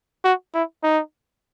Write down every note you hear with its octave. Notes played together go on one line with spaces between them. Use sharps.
F#4
E4
D#4